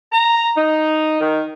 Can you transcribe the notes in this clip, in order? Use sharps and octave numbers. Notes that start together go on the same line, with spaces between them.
A#5
D#4
D#3